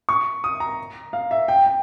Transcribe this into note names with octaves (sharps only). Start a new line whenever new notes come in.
C#6
D#6
A#5
F5
E5
G5
G5